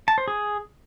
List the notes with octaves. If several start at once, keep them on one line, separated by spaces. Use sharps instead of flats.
A5
C5
G#4